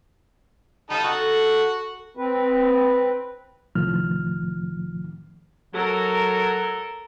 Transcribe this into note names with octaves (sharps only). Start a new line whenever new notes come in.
G3 D#4 F4 A4
F#4 A4
C4 B4
C2 A2 D#3 F3 F6
F#3 A4 A#4